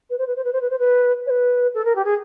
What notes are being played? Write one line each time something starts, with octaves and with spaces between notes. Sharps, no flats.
B4
C5
B4
C5
B4
C5
B4
C5
B4
C#5
B4
A4
A#4
G4
G#4